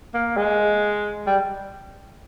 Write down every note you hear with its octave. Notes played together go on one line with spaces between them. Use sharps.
A#3
G#3
G3